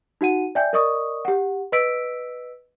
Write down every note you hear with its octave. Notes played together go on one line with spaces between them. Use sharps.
D#4 F#4 F#5 D#7
D5 E5 G5 G#5 G6
A#4 D5 D#5 C#6 D#6
G4 F#5
B4 D#5 E6 B6 D7